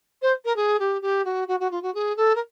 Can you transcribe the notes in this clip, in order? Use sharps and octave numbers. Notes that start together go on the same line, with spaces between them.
C5
A#4
G#4
G4
G4
F#4
F#4
F#4
F4
F#4
G#4
A4
A#4